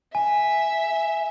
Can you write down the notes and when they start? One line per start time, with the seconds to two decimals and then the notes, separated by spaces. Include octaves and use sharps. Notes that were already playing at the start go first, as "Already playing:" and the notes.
0.14 E5 G#5